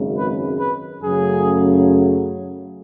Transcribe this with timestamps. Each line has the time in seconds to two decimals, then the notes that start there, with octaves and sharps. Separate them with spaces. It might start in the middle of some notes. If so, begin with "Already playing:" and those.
Already playing: G#1 F#2 C#3 G#3
0.17 B4
0.60 B4
1.03 F#2 C#3 F#3 A3 G#4